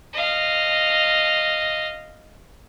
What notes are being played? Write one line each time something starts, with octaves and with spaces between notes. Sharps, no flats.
D#5 F5